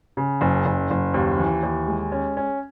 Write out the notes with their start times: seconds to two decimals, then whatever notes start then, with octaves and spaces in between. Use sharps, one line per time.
0.17 C#3
0.41 F#1
0.65 F#1
0.90 F#1
1.14 D#2
1.39 E3
1.63 D#2
1.88 G#3
2.12 C#4
2.37 C#4